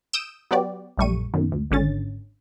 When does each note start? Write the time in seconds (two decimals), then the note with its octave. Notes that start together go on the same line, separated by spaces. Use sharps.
0.13 D#6 E6 G6 D7 E7
0.51 F#3 B3 F#4 G4 D5
0.98 A#1 F#2 G3 A3 C#6 D#7
1.34 F#2 B2 D#3
1.52 D2
1.71 G#1 D3 C#4 A6